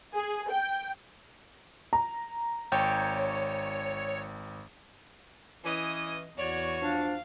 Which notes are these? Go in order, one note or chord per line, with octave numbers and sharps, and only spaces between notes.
G#4
G5
A#5
G#1 C#5 G5
E3 C#4 D#5 D#6
E2 F#4 C#5 D5
F3 D4 F5